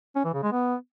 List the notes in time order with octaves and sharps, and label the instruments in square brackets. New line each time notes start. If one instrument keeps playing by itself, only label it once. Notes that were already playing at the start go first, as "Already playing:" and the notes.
[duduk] C#4
E3
C#3
G#3
B3